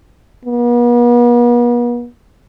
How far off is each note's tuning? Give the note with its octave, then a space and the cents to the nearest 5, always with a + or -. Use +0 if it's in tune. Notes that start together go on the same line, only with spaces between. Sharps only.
B3 -45